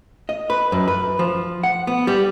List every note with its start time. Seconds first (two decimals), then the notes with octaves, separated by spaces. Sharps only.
0.29 D#5
0.50 B4
0.72 F#2
0.88 B4
1.19 F3
1.63 F#5
1.87 B3
2.07 G3